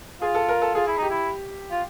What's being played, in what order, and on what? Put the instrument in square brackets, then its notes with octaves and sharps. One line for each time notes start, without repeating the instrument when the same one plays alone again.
[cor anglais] F4 [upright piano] G#4
[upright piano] A4
A#4
A4
[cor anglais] F4 [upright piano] G#4
[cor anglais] E4
[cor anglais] D#4 [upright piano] G4
[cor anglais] E4
F4